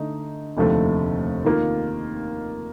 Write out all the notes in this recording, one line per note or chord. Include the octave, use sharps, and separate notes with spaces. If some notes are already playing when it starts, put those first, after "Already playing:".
Already playing: D3 A3 D#4 D#5
F1 D#2 D3 F3 A3
D#3 A#3 F4